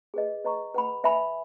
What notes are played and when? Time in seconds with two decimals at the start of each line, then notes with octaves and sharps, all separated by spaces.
0.14 G#4 B4 D#5
0.45 B4 D#5 A#5 C#6
0.74 B4 F#5 B5
1.04 B4 E5 G#5 B5